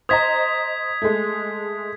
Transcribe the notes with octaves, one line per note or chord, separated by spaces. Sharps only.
C5 D#5 A#5 D#6 G#6 B6
G#3 A3